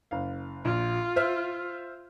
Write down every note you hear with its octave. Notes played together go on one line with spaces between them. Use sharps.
F#1 F5
A#1 F4
C5 E5 F6